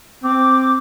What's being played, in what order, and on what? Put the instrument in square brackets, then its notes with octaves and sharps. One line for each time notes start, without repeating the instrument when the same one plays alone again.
[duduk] C4 [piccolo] D6